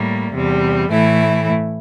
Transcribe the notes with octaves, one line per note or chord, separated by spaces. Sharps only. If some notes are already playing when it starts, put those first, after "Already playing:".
Already playing: A2 G3 A#3
E2 C3 G3
A2 E3 A3 E4